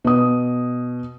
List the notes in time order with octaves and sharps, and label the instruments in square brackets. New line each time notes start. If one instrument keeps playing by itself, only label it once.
[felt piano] B2 D#6